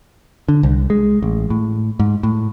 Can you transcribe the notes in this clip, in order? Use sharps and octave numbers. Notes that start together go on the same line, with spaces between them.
D3
C2
G#3
A1
A2
G#2
A2